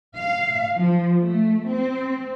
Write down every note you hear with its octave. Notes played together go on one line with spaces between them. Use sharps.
F5
F3
A3
C4